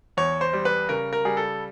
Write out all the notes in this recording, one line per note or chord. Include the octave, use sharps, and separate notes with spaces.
E2 C#5
C5
G3
B4
C#3 A#4
A#4
G3 G#4
A4